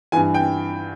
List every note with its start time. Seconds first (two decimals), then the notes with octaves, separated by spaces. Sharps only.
0.12 G2 E3 G#5
0.34 G5